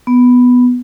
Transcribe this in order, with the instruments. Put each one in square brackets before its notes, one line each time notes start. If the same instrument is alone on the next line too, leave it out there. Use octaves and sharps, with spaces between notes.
[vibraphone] B3